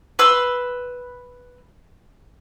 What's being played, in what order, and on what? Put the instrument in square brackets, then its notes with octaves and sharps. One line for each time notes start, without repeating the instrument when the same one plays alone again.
[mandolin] B4 C6 E6